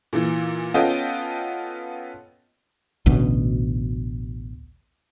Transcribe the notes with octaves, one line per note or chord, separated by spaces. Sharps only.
A#2 E3
B3 C#4 F4 A4 D#5 G5
A1 D2 B2